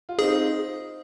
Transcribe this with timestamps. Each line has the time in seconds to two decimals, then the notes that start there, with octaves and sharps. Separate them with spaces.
0.09 F4
0.19 C4 D#4 G#4